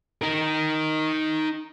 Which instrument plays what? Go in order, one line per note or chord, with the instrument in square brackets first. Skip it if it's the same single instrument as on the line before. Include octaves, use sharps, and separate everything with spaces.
[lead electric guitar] D#4 A#4